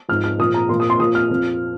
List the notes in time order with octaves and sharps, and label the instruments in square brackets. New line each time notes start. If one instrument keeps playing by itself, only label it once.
[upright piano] G#2 F3 F6
F6
A#2 F3 D#6
A#5
A#2 F3 C6
D#6
C6
A#2 F3 D#6
F6
F2 F3